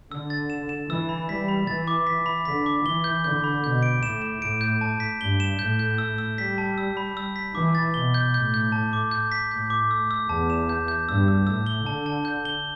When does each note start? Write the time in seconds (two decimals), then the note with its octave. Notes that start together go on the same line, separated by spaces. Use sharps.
0.11 D3 E6
0.30 A6
0.50 E7
0.69 E7
0.89 E3 E6
1.09 B5
1.29 G3 B6
1.48 B5
1.67 E3 A6
1.87 D6
2.07 B6
2.26 B5
2.45 D3 B6
2.66 D6
2.85 E3 G7
3.04 G6
3.24 D3 G6
3.44 B5
3.64 B2 G6
3.83 D7
4.03 A2 E7
4.22 E7
4.41 A2 D7
4.61 G6
4.81 A5
5.00 B6
5.21 G2 G7
5.40 E7
5.59 A2 G6
5.79 G6
5.98 E6
6.18 E6
6.38 G3 B6
6.58 A5
6.78 E6
6.97 B5
7.17 E6
7.36 B6
7.55 E3 D6
7.75 A6
7.94 B2 G7
8.14 G6
8.34 A2 G6
8.54 G6
8.72 A5
8.93 D6
9.11 G6
9.32 B6
9.51 A2 G6
9.70 D6
9.91 E6
10.11 E6
10.29 E2 A5
10.50 E7
10.69 G6
10.88 G6
11.08 G2 E6
11.28 E6
11.47 A2 E6
11.66 G7
11.86 D3 A5
12.06 A5
12.25 G6
12.45 G7